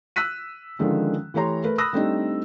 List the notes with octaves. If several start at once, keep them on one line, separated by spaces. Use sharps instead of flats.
E6 F#6 B6 D#7
D3 D#3 F3 G#3 C#4
E3 A3 G4 C#5 A#5 C6
A3 A#4 B4
B5 D#6 E6 F#6 A#6
G3 A3 C4 D4 D#4 G4